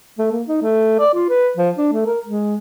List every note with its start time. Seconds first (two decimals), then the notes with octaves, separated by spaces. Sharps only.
0.18 A3
0.32 A#3
0.48 D#4
0.62 A3
0.99 D5
1.14 F4
1.29 B4
1.57 F3
1.78 D4
1.92 A3
2.07 A#4
2.26 G#3